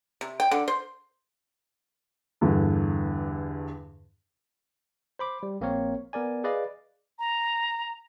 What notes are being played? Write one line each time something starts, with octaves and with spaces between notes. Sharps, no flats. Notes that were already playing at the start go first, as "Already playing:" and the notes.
C3
G5
D3
C5
E2 G2 D3
C5 B5 D6
G3
A#1 A#3 C4 A#4 C#5
B3 A#4 D5 G#5
G#4 B4 D5 D#5 F5
A#5